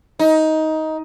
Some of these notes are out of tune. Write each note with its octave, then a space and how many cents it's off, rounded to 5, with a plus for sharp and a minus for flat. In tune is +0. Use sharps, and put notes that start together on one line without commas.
D#4 +15